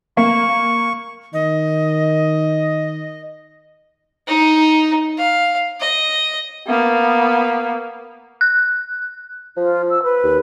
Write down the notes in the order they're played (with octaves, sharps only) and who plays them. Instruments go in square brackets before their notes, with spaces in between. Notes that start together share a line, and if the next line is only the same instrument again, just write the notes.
[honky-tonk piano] A#3 [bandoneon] C#6
[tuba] D#3 [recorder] D#5
[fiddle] D#4
F5
D#5
[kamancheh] A#3 B3
[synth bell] F#6
[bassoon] F3 [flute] F4
[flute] E6
B4
[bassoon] D#2